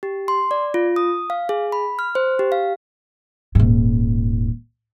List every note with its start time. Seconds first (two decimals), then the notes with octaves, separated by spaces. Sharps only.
0.03 G4
0.28 C6
0.51 D5
0.74 F4
0.96 D#6
1.30 F5
1.49 G#4
1.72 B5
1.99 F6
2.15 C5
2.39 G4
2.52 F5
3.55 D#1 G#2